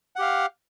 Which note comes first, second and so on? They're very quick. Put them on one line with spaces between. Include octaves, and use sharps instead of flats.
F#5 G4 F5